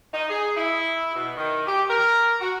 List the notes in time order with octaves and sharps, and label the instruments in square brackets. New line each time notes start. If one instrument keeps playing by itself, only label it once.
[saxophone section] D#4
G#4
E4
B2
D#3
G4
A#4
F#4